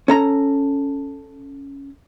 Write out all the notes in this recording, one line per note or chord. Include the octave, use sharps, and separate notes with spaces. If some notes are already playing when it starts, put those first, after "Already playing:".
C#4 A4 A#5